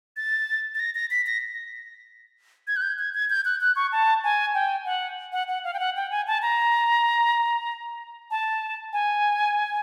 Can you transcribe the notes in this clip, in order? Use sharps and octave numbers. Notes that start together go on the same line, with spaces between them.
A6
A6
A#6
A#6
B6
A#6
G#6
F#6
G6
G#6
G#6
G6
F#6
F#6
C#6
A5
G#5
G5
F#5
F#5
F#5
F5
G5
F#5
G5
G#5
A5
A#5
A5
G#5